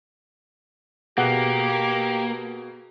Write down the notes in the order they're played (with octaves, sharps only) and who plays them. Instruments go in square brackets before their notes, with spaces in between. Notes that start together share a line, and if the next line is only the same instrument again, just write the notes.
[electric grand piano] B2 G#4 [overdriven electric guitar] A#3 [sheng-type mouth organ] G4 D6 [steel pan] F#5